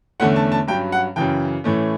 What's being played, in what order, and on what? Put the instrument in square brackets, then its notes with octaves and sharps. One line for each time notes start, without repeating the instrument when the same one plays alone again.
[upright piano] E2 D3 A3 C#4 F#5
A5
A5
G2 F#3 C#4 G5
F#5
F#2 C#3 E3 G5
A2 E3 A3 C#4